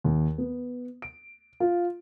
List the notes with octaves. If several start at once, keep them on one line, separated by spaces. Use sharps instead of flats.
D#2
B3
D7
F4